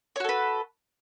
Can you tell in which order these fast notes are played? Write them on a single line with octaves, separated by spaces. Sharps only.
C#5 F#4 A4 B4